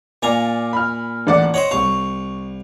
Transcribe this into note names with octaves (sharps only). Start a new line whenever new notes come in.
A#2 D5 F5 G#5 A#5
B5 F6
A1 D5 F#5
C5 C#5 D#5 F#5
C2 F5 C#6